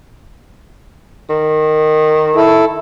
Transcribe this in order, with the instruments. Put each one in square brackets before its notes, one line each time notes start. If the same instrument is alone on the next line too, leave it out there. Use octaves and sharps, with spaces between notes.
[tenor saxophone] D#3
[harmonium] E4 A4